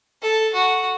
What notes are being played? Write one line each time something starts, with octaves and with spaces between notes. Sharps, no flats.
A4
F#4